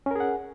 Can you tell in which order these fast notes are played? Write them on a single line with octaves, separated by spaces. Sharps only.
C#4 A#4 G#4 F#5